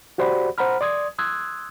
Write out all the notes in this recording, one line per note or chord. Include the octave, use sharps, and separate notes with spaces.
F#4 G4 C5 D5 F#5 B5
C5 F#5 A#5 B5 F6
D5 C6 D#6 G#6
C6 D#6 E6 F#6 G#6